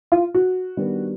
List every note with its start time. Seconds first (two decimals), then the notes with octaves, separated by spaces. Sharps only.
0.12 F4
0.35 F#4
0.77 D#3 G3 B3 D4